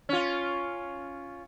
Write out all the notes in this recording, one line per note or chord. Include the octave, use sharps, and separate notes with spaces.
C#4 F4